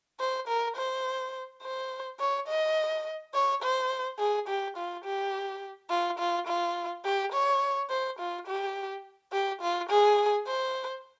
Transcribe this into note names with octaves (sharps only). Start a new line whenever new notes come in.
C5
A#4
C5
C5
C#5
D#5
C#5
C5
G#4
G4
F4
G4
F4
F4
F4
G4
C#5
C5
F4
G4
G4
F4
G#4
C5